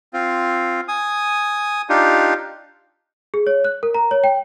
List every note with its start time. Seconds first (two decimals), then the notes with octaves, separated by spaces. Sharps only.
0.14 C4 F4
0.88 G#5 D#6
1.89 D4 D#4 F4 G4
3.34 G#4
3.47 C#5
3.64 F#6
3.83 A#4
3.94 A#5
4.11 C#5
4.24 G5